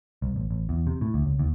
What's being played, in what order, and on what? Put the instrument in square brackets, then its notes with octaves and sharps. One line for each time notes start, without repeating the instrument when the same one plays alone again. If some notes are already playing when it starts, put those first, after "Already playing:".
[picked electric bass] C2
A1
A1
E2
C3
A2
D2
C#2
D#2